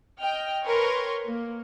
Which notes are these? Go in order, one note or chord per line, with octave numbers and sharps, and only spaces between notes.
D#5 G5 F6
A#4 B4 C#5 G#5 C6 C#6
A#3